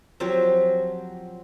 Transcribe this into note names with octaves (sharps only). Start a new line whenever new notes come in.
F3 F#3 C4 G4